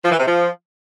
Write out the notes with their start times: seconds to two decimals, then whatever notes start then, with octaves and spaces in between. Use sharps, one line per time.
0.04 F3
0.11 E3
0.19 C3
0.27 F3